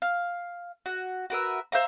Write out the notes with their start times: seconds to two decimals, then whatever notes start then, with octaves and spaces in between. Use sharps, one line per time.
0.02 F5
0.86 F#4
1.30 F#4 A#4 B4 E5
1.72 C5 E5 F5 A#5